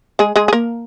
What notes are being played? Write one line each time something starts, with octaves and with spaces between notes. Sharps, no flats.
G#3 G#4
G#3 G#4
G#4
A#3 A#4